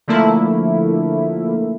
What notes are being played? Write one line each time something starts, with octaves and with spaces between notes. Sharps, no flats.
D3 F3 A3 A#3 E4